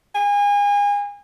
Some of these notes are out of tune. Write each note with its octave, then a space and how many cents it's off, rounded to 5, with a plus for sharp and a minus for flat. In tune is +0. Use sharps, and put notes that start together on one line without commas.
G#5 -30